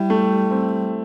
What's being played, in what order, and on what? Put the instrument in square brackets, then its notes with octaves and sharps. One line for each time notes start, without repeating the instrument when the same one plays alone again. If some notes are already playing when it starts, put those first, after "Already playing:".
Already playing: [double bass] G3 [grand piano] E4
[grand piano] A3
C4